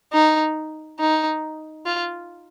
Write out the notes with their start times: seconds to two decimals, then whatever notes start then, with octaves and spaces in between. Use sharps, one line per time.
0.13 D#4
1.00 D#4
1.86 F4